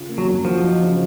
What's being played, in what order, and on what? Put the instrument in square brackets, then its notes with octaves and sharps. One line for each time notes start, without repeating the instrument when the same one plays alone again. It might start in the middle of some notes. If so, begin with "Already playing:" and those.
Already playing: [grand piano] C#3 F4
A#3
[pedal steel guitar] F#3
[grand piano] F#2
[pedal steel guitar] F3 [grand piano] F#4
[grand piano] D#4
C#3